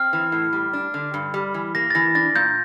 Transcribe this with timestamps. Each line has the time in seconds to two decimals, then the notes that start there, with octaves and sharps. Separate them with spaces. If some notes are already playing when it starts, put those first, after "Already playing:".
Already playing: C4 F6
0.13 E3
0.32 A2
0.53 G3
0.73 D4
0.94 D3
1.14 G2
1.34 G3
1.54 E3
1.75 A#3 A#6
1.90 A6
1.95 E3 A#6
2.15 D4 A6
2.35 A#2 G6